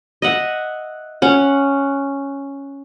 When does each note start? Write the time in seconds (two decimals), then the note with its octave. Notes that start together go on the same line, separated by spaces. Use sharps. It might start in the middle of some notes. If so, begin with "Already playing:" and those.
0.22 D#5 E5 F#5
1.22 C#4 F#5